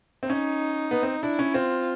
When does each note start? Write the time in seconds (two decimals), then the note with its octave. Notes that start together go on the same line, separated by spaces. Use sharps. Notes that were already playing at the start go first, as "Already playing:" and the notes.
0.23 C4
0.29 C#4 D#4
0.91 B3
1.03 C4
1.22 D4 E4
1.39 C#4
1.54 C4 F4